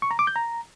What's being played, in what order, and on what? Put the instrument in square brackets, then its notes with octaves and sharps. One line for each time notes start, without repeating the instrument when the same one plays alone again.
[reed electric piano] C#6
A#5
D6
G6
A#5